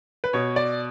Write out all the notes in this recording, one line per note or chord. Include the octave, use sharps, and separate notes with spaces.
B4
B2 C#5
D5